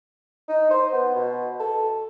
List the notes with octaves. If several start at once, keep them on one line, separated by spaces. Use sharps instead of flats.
D#4
C5
B3
B2
A4